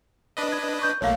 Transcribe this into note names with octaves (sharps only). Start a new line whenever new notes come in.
D4 B4 D#5
G#6
C#6 G6
B1 A3 A#3 C#5 F5